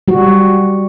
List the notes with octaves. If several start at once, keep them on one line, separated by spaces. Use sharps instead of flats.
G3 F#4